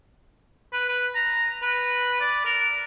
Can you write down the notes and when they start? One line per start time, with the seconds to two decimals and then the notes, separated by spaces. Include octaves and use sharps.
0.73 B4
0.89 B4
1.15 A#5
1.62 B4
2.21 D5
2.46 A#4